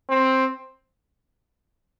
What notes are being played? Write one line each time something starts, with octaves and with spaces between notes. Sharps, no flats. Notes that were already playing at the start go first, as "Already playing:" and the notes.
C4